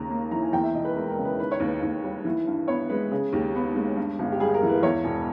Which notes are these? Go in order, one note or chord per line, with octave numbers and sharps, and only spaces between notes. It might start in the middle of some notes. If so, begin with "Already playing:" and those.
Already playing: D#2 C#3 A#5
A#3
E3 A#5
G#5
E2 G5
E5
E1 D#5
B4
G#3 A#4
A#4
C#3
B4
D#3 B4
C#5
D#2 B4
D#2
G3
E3
G2
B3 C#5
G#3 B4
C#3 G#4
D#2 G4
B3
G#3
G2
G1
G4
G3 G#4
A#4
E3
B4
E2 C#5
E1